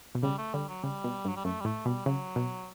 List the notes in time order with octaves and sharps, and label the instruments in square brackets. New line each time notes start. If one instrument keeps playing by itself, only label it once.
[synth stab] B2
[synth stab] C#3 [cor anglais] G3
[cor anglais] A3
[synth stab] D3 [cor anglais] G3
[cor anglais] F#3
[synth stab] C#3 [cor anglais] G3
[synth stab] B2
G2
[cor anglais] F#3
G3
[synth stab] F#2 [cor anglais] A3
[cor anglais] G3
[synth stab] A2 [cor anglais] A3
[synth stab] B2 [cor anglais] G3
[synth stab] C#3 [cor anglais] F#3
[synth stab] B2